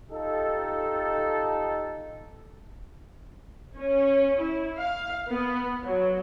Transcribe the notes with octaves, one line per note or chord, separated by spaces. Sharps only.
D#4 F4 G4 A4
C#4
E4
F5
B3
F#3